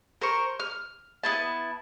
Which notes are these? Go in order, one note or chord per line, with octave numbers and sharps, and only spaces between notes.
A#4 C5 C#6
F6
B3 C4 E4 A5